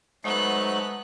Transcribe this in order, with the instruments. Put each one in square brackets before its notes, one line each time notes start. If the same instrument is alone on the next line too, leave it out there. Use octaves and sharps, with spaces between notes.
[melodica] F#3 A3 D#4 [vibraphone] G#3 C5 [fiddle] B3 F#6